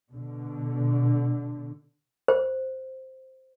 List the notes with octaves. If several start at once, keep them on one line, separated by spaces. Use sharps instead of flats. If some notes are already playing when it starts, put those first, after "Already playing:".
B2 D3
C5